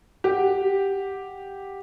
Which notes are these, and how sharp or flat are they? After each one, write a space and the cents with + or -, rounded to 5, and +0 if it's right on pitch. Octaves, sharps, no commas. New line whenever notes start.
G4 +0 F#5 +0